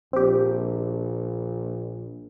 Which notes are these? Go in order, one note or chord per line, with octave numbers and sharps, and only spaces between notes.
A#1 C4 G4